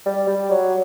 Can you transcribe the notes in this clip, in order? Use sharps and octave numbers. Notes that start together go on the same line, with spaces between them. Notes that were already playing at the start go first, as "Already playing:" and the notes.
G3
G3
F#3